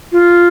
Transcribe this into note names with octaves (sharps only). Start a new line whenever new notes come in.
F4